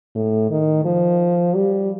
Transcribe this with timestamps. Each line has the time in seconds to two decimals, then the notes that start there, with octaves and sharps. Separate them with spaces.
0.15 A2
0.50 D#3
0.85 F3
1.55 G3